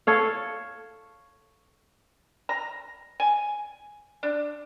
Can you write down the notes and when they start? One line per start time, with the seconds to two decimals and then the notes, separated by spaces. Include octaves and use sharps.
0.07 A4 C#5 F5
2.49 A#5
3.20 G#5
4.23 D4